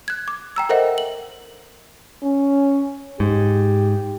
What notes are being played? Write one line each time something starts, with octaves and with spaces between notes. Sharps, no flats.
F#6 G#6
D6
G5 A#5 E6
A4 A#4 C5 D#5 E5 F#5
F#7
C#4
G#2 G4